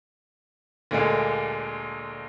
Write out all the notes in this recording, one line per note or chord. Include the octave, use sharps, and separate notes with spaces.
D2 A#2 D3 G#3 A#3